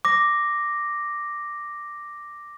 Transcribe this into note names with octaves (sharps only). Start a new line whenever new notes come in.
D6 A#6